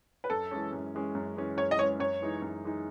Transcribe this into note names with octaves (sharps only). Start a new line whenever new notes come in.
B4
F#2 A4
E3 G#3 C#4
F#2
E3 G#3 C#4
F#2
E3 G#3 C#4
F#2 C#5
D#5
E3 G#3 C#4 C#5
F#2 C#5
E3 G#3 D#4
F#2
E3 G#3 D#4